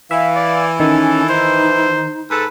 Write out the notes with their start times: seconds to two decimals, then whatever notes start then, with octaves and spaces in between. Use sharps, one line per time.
0.11 E3 E5 F5
0.36 D5
0.80 D#3 C#4 A4
1.29 D#4 C5
2.31 G#2 A4 B4